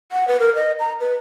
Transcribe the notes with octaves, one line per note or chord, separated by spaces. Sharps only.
F#5
B4
A#4
D#5
A#5
B4